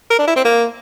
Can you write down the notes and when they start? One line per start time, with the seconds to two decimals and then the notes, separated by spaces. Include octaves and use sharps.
0.10 A#4
0.19 D4
0.27 E4
0.36 C4
0.44 A#3